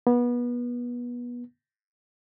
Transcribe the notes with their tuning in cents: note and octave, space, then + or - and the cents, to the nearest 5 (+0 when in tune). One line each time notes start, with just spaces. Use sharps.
B3 -25